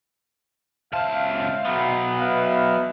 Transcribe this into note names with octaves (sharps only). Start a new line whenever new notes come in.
C#2 C5 E5 F5 A5
F#3 B3
B4 E5 F5